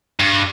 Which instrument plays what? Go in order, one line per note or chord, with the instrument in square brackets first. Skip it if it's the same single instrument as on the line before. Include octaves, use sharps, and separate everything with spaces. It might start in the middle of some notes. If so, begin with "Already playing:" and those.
[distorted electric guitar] G2